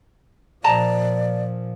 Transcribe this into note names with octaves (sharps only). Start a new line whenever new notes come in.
A#2 F3 D5 D#5 A5 A#5